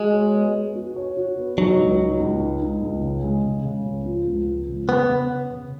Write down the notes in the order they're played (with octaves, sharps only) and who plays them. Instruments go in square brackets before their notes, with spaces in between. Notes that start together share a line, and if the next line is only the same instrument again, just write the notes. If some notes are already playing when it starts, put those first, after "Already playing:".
Already playing: [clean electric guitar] G#3 [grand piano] F#4
[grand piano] C#5
B3
B3
F#4
C#5
F#4
B3
[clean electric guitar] F#3 [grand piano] D#4
[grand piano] C#2
D#4
C#2
D#4
D#4
C#2
C#3
G#3
C#3
C#3
C#2
F3
C#2
F3
C#3
[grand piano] C#3 [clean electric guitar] B3
[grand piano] C#3
B3
C#3